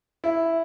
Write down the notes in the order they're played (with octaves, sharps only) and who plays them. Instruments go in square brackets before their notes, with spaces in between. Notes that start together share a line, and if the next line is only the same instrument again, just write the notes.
[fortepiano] E4